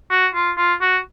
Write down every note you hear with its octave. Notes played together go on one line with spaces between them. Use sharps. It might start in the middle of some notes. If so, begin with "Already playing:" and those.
F#4
F4
F4
F#4